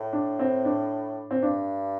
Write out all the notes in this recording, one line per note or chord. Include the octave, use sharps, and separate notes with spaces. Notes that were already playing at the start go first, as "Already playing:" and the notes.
Already playing: A2
D4
C4
D4
C4
G2 D4